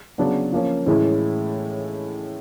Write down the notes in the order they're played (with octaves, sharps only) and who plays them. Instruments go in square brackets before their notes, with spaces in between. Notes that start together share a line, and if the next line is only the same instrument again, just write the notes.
[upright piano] C#3 F#3 B3 D4
F3 A#3 C#4
A2 E3 G#3 C#4 E4